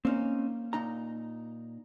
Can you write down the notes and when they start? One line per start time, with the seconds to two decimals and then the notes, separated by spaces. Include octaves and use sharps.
0.05 A#3 C4 C#4 D#4
0.73 A#2 D#4 A#5